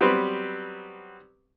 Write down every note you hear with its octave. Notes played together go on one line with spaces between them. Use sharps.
F#3 G3 B3 C4 B4 C6